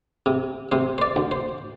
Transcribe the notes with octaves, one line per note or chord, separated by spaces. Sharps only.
C3
C3 C5
C5
D5
D2
C5